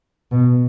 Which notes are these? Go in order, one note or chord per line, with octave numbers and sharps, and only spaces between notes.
B2